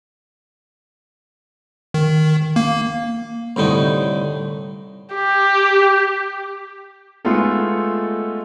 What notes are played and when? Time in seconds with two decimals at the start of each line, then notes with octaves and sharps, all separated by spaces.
1.94 D#3
2.56 A#3
3.56 C2 A2 D3 D#4
5.15 G4
7.25 G#3 A3 B3 D#4 F4 A4